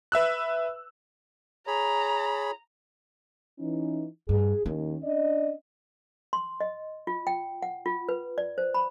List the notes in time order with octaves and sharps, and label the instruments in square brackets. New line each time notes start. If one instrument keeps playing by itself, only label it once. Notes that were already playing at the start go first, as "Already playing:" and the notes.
[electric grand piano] B4 E5 E6 F#6
[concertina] G#4 C#5 B5 [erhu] A#5
[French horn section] E3 C#4 D#4
[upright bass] G2 [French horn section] G#4
[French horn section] D#2 D#3 [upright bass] C#4
[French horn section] D4 D5 D#5
[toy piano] C6
D#5
F4
G5
F#5
F4
B4
D5
C5
B5